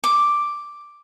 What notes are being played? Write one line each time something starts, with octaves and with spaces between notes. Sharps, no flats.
D6